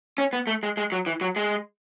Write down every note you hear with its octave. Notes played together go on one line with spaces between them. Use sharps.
C#4
B3
A3
G#3
G#3
F#3
E3
F#3
G#3